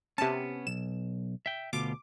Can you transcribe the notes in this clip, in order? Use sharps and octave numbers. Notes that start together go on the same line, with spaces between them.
C3 B3 C#4 A5
B1 E7
E5 G5
D2 B2 F4 D6